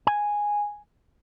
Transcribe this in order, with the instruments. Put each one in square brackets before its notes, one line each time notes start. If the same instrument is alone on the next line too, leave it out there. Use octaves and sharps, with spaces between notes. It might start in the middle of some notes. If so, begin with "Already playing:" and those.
[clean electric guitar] G#5